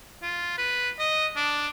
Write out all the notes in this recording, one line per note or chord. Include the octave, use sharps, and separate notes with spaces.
F4
B4
D#5
D4